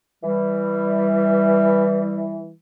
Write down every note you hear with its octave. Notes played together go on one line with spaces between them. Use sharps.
E3 G3